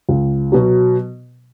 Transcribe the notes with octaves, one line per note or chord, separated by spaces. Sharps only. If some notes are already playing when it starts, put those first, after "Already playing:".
C#2
B2 F#3